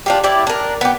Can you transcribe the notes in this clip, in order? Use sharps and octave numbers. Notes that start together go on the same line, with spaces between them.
D4 F4 G4
E4 G4 D5 E5
D4 A#4
B3 G4